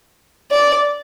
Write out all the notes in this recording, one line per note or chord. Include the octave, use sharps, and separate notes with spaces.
D5